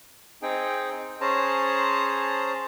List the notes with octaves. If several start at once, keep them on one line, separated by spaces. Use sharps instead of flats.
C4 D#4 G#4 G5
C#4 G#4 C5 A5 A#5